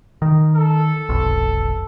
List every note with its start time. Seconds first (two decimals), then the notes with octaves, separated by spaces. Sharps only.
0.22 D#3
0.56 A4
1.09 F1 B1